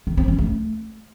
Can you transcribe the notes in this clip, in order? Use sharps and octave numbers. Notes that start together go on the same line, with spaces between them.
D#3
C4
C#4
A3